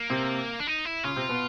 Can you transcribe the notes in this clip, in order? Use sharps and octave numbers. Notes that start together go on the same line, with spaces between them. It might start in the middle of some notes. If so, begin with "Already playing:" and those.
Already playing: A#3
C3 C4
D4
D#4
E4
C#3 C#4 F4
C3 C4
B2 B3